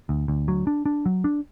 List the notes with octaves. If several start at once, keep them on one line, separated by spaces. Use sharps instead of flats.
D2
D2
F#3
D4
D4
F#3
D4